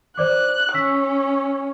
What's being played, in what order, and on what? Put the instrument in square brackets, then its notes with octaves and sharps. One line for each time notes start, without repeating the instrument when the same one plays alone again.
[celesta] C5 D5 D6 [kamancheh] F#6
[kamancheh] C#4 [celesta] E6 B6